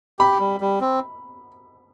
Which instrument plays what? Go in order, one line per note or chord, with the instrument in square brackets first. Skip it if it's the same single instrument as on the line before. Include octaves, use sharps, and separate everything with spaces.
[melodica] G4 [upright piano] B5
[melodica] G3
G3
C4